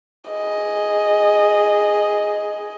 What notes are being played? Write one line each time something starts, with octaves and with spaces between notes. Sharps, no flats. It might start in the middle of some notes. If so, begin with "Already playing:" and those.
G#4 D#5